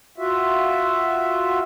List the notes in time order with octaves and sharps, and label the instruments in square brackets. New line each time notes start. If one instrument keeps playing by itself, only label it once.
[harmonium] F4 F#4 E5